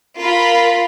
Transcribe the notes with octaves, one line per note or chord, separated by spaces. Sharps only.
F4 A#4 B5